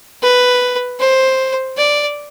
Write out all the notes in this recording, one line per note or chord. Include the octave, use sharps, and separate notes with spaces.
B4
C5
D5